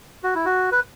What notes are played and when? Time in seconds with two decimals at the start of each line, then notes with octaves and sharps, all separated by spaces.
0.23 F#4
0.35 E4
0.45 F#4
0.72 B4